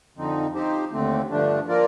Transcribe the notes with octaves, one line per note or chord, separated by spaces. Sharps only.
F2 D3 F3 C4 D#4
F3 C4 D#4 G4 C5
D#2 D3 A3 C4
G2 D3 F3 A3 D4
F3 A#3 F4 A#4 D5